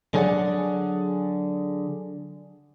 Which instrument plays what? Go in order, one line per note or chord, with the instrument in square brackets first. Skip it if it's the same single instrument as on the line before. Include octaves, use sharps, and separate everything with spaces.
[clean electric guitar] D3 F#3 G#4 C5 D5 F#5